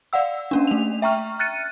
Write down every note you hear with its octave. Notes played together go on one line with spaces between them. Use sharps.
D5 F5 F#5 E6
A#3 C#4 D4
A3 F7
E5 G5 A#5 C#6 F6
F6 F#6 A6 C#7 D#7